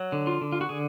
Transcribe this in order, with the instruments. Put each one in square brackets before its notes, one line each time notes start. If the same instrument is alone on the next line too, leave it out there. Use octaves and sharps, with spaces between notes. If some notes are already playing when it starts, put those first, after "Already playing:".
Already playing: [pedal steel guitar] F#3
D3
F4
D3
F4
F#4
D3 G#4